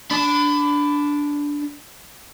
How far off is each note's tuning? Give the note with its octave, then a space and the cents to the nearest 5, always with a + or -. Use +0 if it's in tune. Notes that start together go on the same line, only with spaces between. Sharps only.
D4 -10 B5 +25